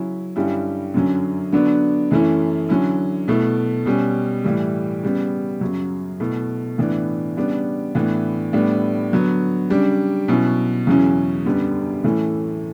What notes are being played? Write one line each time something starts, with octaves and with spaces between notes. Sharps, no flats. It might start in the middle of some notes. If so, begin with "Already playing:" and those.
Already playing: C#3 F#3 C#4 E4
G2 D3 G3 C#4 E4
F#2 D3 F#3 C#4
D3 F#3 B3 D4
F#2 E3 A3 C#4 E4
D3 F#3 C#4 E4
B2 A3 E4
B2 G3 C#4
A2 E3 G3
C#3 G3 B3
F#2 C#3 F#3
B2 A3 E4
A2 E3 B3 D4
C#3 G3 B3 D4
A2 E3 B3 D4
A2 G3 B3 D4
D3 F#3 B3
C#3 G3 D4
B2 F#3 C#4 E4
E2 C#3 F#3 C#4 E4
F#2 D3 G3 B3
A2 E3 A3 C#4 E4